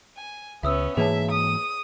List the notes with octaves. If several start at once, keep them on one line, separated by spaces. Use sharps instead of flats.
G#5
C#2 B3 C#4 E5 D#6 E6
G#2 E3 A#3 G#4 C#5 E5 A5
D#6